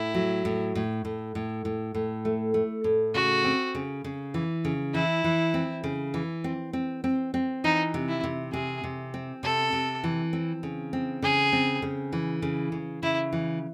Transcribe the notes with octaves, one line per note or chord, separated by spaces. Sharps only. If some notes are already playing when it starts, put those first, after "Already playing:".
Already playing: A2 E4
F#3
A2
A2
A2
A2
A2
A2
A3
A3
A2
C#3 F#4
C4
C#3
C#3
E3
C#3
E3 E4
E3
C4
C#3
E3
C4
C4
C4
C4
E3 D#4
C3
E4
C3
C3 G#4
C3
C4
C3 A4
C3
E3
C4
C#3
C4
C#3 G#4
C4
C#3
E3
C#3
C#3
C#3 E4
E3